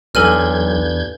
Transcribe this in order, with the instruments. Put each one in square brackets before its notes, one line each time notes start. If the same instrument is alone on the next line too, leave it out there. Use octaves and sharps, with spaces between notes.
[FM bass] B1 [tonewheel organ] E2 G6 G#6 [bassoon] G2 [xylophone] A4 G#5 F6